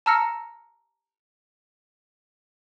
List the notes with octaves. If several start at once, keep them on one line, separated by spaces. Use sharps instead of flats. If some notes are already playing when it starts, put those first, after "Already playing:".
A5 A#5 E6 F6 A#6 C#7